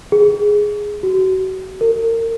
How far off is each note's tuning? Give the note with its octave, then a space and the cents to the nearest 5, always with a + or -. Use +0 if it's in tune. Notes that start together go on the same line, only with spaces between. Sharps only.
G#4 +0
F#4 +30
A#4 -35